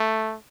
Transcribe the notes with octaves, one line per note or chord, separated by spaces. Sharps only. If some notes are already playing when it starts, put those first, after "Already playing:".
Already playing: A3